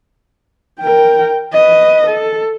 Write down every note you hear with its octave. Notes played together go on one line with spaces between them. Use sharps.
A#4 G5
B4 D#5
A4